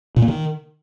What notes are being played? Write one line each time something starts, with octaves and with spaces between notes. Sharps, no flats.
A#2
A#3
D#3